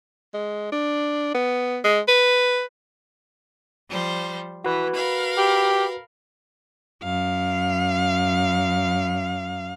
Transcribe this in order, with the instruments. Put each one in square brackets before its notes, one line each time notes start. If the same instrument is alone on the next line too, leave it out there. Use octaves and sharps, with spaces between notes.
[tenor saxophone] G#3
D4
B3
G#3
B4
[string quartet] F3 G3 C5
[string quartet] E3 [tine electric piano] F#4 B4
[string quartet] A#4 F5 B5
[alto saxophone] G4
[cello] F#2 F5